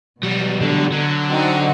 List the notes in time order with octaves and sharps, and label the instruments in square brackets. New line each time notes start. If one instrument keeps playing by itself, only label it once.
[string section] B2 [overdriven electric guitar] F#3 G3
[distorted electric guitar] D3
[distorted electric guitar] D3 [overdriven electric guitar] F#3
[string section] C4 D#4 F#4